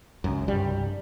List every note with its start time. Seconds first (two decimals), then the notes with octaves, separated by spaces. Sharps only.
0.24 C#2 F#2
0.48 C2 G2 G3